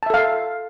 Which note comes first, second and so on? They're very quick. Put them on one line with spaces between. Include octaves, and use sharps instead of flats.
A5 E5 A4 F5